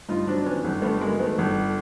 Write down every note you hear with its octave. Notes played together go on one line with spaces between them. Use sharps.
G2 D#4 F4
F#3 C4 D4
D#3 B3 C#4
G1
G2 A3 B3
F#3 G#3 A#3
D#3 A3 B3
G1